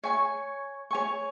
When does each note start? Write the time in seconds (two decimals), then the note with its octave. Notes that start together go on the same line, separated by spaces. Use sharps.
0.04 C#5 G#5 C#6
0.91 C#5 G#5 C#6